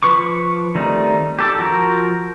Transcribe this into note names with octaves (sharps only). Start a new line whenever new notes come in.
F3 B4 C#6 D6
D#3 G3 A3 C4 D#4
G4 A4 D6
F3 F#4 A#4 G6